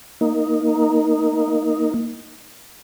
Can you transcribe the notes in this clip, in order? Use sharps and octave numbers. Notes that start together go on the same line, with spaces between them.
A#3 D#4